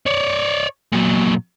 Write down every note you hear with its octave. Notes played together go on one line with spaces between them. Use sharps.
C#5 D5
A#2 F#3